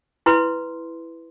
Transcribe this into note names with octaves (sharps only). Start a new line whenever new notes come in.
E4 B4 C6